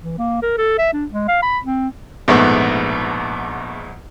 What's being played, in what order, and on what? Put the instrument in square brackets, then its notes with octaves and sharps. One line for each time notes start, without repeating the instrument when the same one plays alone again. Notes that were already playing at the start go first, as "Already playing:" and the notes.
[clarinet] E3
A#3
A#4
A4
E5
D4
G#3
F5
B5
C4
[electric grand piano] A#1 G#2 [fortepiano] B2 A3 B3